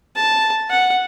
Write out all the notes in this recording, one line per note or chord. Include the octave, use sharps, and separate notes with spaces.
A5
F#5